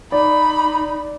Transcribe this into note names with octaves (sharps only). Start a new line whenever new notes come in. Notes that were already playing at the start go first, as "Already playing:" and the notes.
D#4 D5 B5